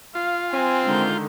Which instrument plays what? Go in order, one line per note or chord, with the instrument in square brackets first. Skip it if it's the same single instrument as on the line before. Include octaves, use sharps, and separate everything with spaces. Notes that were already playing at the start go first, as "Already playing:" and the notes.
[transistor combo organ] F4 [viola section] F5
[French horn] C4 [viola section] G#5
[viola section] D3 D#3 [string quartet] G#3 A#5 G6